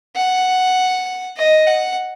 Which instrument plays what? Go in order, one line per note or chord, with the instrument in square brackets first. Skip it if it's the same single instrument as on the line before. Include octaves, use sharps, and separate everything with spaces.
[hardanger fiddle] F#5
D#5
F#5